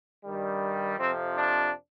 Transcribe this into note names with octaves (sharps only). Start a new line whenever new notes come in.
G2 D#3 G3
F2 C3 F3 C4
D4